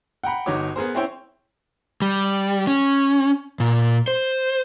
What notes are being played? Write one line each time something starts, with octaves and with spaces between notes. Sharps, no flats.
F#5 G5 A#5 B5
G1 D#4 F#4 C#5 D6
B3 G#4 A#4 C5
C4 C#4 E4 C5 C#5 G5
G3
C#4
A#2
C5